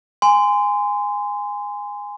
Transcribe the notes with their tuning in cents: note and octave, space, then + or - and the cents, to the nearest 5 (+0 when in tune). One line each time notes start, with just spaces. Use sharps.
G#5 -15 C6 -25